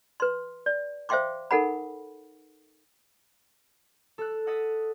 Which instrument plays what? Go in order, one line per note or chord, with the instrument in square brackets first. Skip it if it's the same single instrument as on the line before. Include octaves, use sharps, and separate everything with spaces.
[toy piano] B4 C6
D5
C5 E5 F5 G5 C6 D6
D#4 A4 A#4 F#5 G#5 B5
[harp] A4 E6 F#6
D#5 F#5 D#6 E6 A6 B6